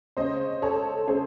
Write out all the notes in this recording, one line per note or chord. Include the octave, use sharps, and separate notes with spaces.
C#3 G#3 C#4 C5 D#5
A4 C#5
C#3 G#3 C#4 G#4 C5